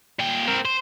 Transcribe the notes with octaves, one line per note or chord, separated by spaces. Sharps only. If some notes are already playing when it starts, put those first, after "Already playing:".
A#2 G5
C4 A#4
C5